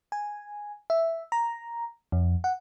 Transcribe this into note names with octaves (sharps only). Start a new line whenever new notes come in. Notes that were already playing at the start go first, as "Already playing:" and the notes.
G#5
E5
A#5
F2
F#5